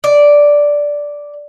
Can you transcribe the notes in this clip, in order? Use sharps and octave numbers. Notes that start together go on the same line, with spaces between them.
D5